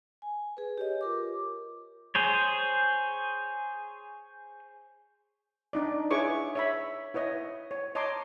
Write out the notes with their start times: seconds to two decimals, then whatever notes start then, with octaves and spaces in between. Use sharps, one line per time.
0.22 G#5
0.57 G#4 B4
0.78 G4 C#5 D#5
1.01 F4 A#4 D6
2.15 G#4 C5 C#5
5.73 D4 D#4 D5
6.11 E4 G#4 B4 C#5 C#6 D6
6.55 C#5 E5 B5
7.14 E4 B4 C#5 D#5
7.71 C#5
7.95 C#5 D#5 A5 A#5 C6 D6